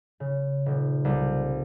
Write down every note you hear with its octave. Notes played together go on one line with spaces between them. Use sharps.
C#3
D#1
C2